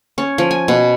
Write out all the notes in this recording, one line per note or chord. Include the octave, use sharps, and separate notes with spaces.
C#4
F3
G#5
B2